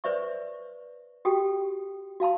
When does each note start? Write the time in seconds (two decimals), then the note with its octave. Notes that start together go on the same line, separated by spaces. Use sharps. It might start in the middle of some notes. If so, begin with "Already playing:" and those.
0.04 B4 C5 D5 E5 C#6
1.25 F#4 G4 A4 G5
2.20 F#4 F5 A5 C6